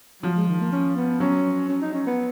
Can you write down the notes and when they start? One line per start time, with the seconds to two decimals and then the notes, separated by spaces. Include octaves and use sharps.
0.23 F3 F#3
0.36 G#3
0.48 D#3
0.60 A#3
0.72 C#4
0.96 B3
1.20 F#3 C#4
1.69 C#4
1.82 D#4
1.93 C#4
2.06 B3